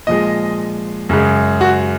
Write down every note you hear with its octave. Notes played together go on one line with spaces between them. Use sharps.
A#2 F3 G#3 D#5
F#2 C#3 G#3
F#4